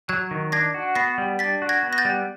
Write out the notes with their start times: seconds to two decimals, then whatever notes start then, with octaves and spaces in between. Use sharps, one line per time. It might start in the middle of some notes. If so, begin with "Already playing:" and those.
0.09 F#3 F#6 G#6
0.31 D#3
0.52 D4 G#6 A#6
0.74 F#4
0.95 B3 A#6 C7
1.18 G3
1.39 D4 A6 B6
1.62 F#4
1.69 G#6 A#6
1.83 B3
1.93 A#6
1.98 G6 A6
2.05 G3